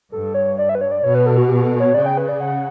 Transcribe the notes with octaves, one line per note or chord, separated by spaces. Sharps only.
G2 A4
C#5
D5
E5
B4
C#5
D5
B2 C#5
B4
A4
F#4
G4
A4
C#5
C#3 D5
G5
B4
D5
F#5